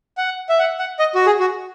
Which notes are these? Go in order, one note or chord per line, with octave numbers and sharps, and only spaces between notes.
F#5
E5
F#5
F#5
D#5
F#4
G#4
F#4